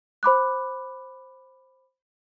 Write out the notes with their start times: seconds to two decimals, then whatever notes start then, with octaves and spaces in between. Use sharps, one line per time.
0.23 C5 B5 D6 F#6